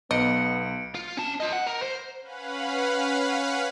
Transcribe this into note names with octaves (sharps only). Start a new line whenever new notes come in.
B1 B3 D#5 C#7 D7
F4
C#4 A5
F4 D#5
F#5
A#4
C5
C#4 B4 F5 F#5 B5